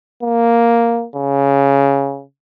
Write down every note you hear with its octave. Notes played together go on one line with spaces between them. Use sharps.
A#3
C#3